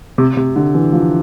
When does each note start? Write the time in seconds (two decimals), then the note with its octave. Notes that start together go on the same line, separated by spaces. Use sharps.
0.18 C3
0.37 C3
0.56 D3
0.74 E3
0.93 F3